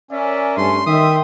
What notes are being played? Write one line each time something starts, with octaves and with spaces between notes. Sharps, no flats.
C#4 A#4 D5 E5
G2 A3 C6
D#3 E5 G5 C6 D#6